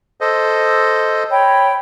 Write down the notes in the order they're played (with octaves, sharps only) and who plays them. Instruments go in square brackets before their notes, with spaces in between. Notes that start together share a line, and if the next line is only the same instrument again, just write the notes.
[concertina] A4 C5 D#5
[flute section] C#5 G5 B5